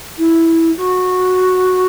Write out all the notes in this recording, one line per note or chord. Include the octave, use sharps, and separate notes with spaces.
E4
F#4